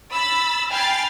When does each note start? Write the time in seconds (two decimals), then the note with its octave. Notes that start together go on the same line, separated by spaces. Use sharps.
0.14 B5 E6 A6
0.70 G5 G#5 B5 F6 A6 C7